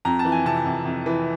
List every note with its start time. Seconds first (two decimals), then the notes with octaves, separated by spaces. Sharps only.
0.05 F2 A#5
0.19 A5
0.25 E3
0.32 G#5
0.45 C3 A5
0.66 F2
0.85 F2
1.06 E3